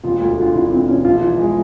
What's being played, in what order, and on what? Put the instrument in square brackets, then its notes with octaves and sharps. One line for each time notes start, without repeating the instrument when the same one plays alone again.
[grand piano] E1 [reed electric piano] F4
[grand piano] D2 [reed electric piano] F4
[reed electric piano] F#4
[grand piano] D3 [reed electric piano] F4
[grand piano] E1 [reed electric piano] E4
[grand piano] D3 [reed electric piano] C4
[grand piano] E1 [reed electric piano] C#4
[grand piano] A#1 [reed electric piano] F4
[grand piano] E3
G#3